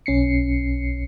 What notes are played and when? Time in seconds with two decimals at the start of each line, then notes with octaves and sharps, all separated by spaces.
0.06 B1 C#4 C7 C#7